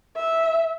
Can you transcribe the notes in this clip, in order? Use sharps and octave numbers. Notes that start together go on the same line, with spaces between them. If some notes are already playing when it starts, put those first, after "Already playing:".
E5